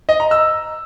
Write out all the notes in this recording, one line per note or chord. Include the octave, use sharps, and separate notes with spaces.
D#5
A#5
E6